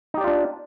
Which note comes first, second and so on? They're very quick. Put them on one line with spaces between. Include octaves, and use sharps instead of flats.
D#4 G4 D5 F4 D4